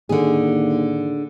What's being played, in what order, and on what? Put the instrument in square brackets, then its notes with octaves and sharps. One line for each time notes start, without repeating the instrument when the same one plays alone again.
[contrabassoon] D#2 [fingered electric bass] A2 D#3 [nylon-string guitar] D3 G#4